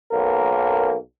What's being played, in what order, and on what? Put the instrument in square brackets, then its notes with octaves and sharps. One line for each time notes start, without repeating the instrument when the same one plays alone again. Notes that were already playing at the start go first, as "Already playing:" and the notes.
[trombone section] B1 A#3 A#4